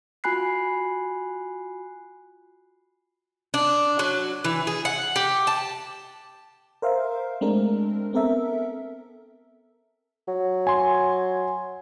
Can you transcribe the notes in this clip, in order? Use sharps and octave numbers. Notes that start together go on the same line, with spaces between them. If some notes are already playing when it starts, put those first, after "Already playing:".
F4 F#4 G#5 B5 F#6 C7
D4
F#3
E3
G#4
F#5
G4
A5
A#4 C5 E5 F5
G#3 A3 C4 D4 A#4
B3 C4 A4 A#4 E5
F#3
G#5 C6